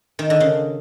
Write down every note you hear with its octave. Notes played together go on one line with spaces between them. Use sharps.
D#3
D3
C#3